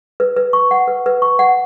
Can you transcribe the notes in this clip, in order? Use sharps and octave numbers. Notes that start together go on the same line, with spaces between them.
B4
B4
C#6
F#5
B4
B4
C#6
F#5